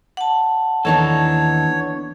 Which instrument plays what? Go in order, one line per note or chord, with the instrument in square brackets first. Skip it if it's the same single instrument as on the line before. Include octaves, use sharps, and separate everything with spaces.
[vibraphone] F#5 A5
[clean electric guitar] D#2 D#4 A4 [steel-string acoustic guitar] E3 B3 D4 [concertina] C#5